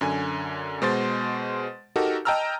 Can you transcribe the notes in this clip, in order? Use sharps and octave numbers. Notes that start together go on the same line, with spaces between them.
F#2 D3 G#5
B2 G#3 C5 C6 A6
D#4 F#4 G4 A4 A#4
D#5 G5 A5 A#5 E6 F6